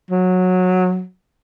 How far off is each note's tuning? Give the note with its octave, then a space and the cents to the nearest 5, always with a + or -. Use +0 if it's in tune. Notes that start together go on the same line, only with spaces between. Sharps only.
F#3 -15